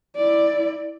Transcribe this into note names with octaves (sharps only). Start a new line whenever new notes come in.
E4 D5